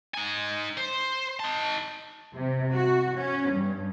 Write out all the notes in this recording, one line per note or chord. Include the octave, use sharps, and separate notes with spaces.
D#4 G#5
C5
D#4 A5
C3
F#4
C#4
G2